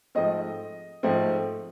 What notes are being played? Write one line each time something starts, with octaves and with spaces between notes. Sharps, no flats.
G#2 F3 A3 C4 D#5
G#2 F3 A3 C4